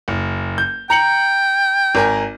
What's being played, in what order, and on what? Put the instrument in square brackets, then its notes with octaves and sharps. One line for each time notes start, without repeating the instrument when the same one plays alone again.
[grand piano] F#1
G6
[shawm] G5 [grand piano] A#5 C#7 F#7
[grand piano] G#1 A#4 G#5